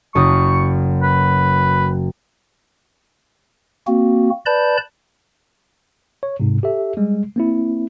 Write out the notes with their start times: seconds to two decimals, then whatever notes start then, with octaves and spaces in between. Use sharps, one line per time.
0.15 F#1 F#2 C#6 D#6
1.02 B4
3.87 A#3 C4 F#4
4.46 B4 D5 A5 B5 G6
6.23 C#5
6.40 G#2 C3
6.63 G4 A4 E5
6.97 G3 G#3
7.36 A#3 C4 E4